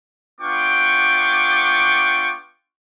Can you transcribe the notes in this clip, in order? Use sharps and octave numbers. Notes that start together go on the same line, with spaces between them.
B3 D4 F4 G5 C#6 D6